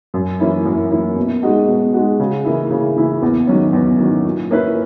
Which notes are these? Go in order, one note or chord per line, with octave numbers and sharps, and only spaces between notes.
F#2
E3 A#3 C#4 E4
F#2
E3 A#3 C#4 E4
B2
G#3 D#4 F#4
B2
G#3 D#4 F#4
C#3
E3 A#3 E4
C#3
E3 A#3 E4
E2
D#3 F#3 C#4
E2
D#3 F#3 C#4
A#2
A#3 C#4 E4 B4